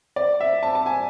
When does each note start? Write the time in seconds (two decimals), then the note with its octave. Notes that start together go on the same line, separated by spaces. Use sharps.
0.16 D5
0.41 E5
0.63 A5
0.75 A5
0.86 G#5